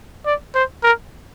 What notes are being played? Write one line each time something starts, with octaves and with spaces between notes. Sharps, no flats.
D5
C5
A#4